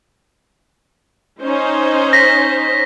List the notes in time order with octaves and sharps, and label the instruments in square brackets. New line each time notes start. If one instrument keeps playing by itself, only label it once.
[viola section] C#4 D#4 C5
[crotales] A#6 B6